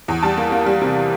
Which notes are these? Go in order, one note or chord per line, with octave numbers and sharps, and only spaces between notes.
E2
G3 A5
A#3
A#3
G3
C3